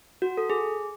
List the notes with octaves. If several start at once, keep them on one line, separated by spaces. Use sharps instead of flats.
F#4
A4
G#4